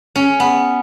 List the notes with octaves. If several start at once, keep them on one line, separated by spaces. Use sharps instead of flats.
C#4
B3